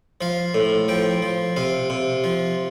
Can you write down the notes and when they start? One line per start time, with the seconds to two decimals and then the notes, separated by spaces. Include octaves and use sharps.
0.21 F3 F5
0.54 A2
0.88 F3 G5
1.22 F3
1.56 C3 F5
1.90 C3
2.24 F3